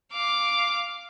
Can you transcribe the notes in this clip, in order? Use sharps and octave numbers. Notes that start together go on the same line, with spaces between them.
F5 D6